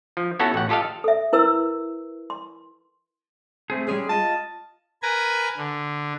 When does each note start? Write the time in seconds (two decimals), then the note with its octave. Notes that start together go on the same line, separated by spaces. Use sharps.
0.17 F3
0.39 B3 C#4 E4 F#4 A4
0.54 A1 F#5
0.69 F4 G4 A4 D#5 F5
1.04 A4 E5
1.33 E4 A#4 B4 E6
2.30 C6
3.70 A3 C4 G#4
3.87 G3 G#3 C#4 G#4
4.09 F4 D#5 A5
5.03 A#4 B4 G#5 A#5 G#6
5.57 D3